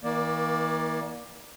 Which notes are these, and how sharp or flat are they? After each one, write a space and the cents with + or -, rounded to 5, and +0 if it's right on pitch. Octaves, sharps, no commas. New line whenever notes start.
E3 -40 A#3 +30 D5 +0